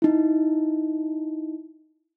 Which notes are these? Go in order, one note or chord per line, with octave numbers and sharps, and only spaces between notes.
D#4 E4